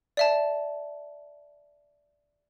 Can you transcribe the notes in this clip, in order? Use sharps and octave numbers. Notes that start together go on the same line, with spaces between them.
D5 E5 A5